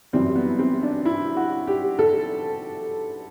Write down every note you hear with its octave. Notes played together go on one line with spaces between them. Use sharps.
F#2 E3 G3 C4
B3
C4
D4
E4
F#4
G4
A4